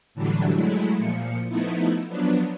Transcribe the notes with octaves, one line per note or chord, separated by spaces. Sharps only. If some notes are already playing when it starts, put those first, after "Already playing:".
A2 D3 E3 F#3 G3 D4
F#3 G#3 A3 E4
A#2 F3 C#7
F3 A3 B3 D#4 E4
F3 F#3 B3 D4